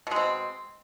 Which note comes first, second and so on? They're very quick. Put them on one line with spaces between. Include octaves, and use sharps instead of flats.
B2 G#3 C4